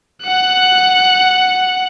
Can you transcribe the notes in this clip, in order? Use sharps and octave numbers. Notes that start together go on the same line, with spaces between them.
F#5 F#6